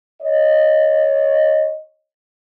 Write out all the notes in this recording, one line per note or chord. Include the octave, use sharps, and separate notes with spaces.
C#5 D#5